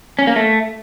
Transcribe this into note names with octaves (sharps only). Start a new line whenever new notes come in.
C#4
A#3
A3